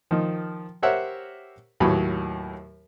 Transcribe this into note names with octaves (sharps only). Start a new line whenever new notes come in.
D#3 F3
G4 A#4 C5 C#5 E5 F#5
D#2 A2 F#3 F#4 B4 B5